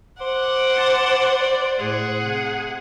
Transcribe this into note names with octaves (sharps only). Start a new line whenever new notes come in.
C5 F#5 D6
A5
D5
A2 G#4 F#5
C3